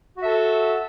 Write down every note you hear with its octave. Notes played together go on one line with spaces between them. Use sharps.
F#4 A4 E5